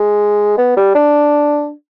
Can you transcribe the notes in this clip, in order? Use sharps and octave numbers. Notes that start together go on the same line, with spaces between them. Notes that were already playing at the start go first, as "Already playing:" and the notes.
Already playing: G#3
B3
G3
D4